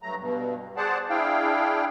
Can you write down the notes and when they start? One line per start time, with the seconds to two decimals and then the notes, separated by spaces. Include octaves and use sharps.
0.02 G2 F#3 A3 A#5
0.19 G2 B2
0.77 G#4 C5 D5 F#5 A5
1.10 D4 E4 G#4 F5 G5